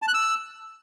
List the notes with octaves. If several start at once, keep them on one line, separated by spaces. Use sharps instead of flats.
A5
F#6
E6